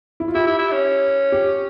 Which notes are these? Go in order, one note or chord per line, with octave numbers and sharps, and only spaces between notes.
E4
F4
E4 G4
E4
E4
C#4
G4